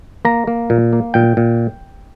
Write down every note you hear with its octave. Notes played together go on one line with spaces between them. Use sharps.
A#3 A#5
A#3
A#2
A#3
A#2 G5
A#2